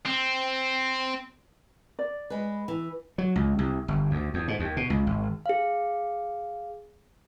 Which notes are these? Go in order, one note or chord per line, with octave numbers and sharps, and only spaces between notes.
C4
D5
G#3 B4
E3
F#3
C#2
C2
G1
D2
E2
G#2
D#2
B2
C#2
G#1
G#4 F5